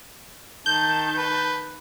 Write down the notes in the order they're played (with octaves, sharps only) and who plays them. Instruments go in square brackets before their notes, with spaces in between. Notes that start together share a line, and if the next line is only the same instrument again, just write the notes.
[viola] D#3 A5 [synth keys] G6
[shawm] B4